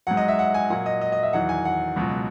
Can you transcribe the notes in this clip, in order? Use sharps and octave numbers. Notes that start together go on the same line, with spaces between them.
G#2 F#3 F#5
D#5
E5
F#5
G#5
A#2 F#3 F#5
D#5
D#5
D#5
E5
E2 D#3 F#3 F#5
G#5
F#5
C#2 B2 F#3